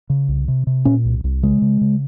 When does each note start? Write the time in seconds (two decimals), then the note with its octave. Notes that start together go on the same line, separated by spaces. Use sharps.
0.10 C#3
0.28 C2
0.48 C3
0.67 C3
0.85 A#2 C#4
1.05 C2
1.24 C2
1.43 C#3 G#3
1.62 C#3
1.81 C#3